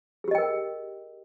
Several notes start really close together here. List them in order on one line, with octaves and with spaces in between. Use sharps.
G#4 G4 D#5 G5 A#4